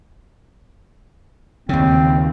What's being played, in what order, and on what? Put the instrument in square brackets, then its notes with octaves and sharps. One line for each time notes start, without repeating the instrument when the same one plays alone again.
[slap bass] D#2 C#3 [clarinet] C4